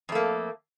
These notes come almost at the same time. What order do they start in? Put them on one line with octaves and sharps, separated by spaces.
F2 A3 A#3